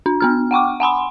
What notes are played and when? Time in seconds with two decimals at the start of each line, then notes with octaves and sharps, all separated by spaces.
0.06 D4
0.20 B3 D4 F6
0.51 F#5 G5 C#6 D6
0.80 F#5 G#5 B5 C6